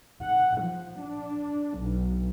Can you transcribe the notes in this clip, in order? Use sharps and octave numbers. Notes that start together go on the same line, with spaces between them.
F#5
F3
D4
B1